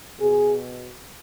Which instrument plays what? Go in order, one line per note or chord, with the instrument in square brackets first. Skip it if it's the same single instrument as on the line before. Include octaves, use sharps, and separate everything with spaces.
[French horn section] B2 G#4